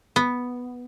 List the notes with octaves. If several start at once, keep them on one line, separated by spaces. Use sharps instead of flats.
B3